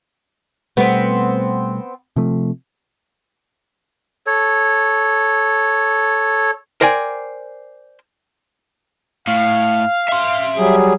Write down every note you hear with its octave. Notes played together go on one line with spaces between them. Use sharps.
B2 G3 A3 B3 C4
C3 F3 A3
A4 C#5
A#4 C5 D5 G5 G#5
A2 F5
E5 C6
F#3 G3 G#4